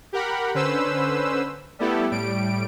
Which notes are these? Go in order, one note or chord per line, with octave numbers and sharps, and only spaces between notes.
G4 A#4 F#5 B5
D3 C#4 B4 C5 E6
G3 A3 B3 E4 G4 A4
A2 G3 D7